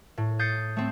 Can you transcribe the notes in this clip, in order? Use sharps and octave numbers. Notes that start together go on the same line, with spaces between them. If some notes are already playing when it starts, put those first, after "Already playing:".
A2
D#6 G6 A6 C7 C#7
A3 C4